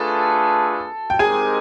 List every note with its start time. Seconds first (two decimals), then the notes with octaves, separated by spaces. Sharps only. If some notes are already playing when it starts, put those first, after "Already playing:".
Already playing: A3 D4 F4 G#4 A4 B4 A5
1.10 G5
1.19 G#3 C4 D#4 G4 G#4 A#4 G#5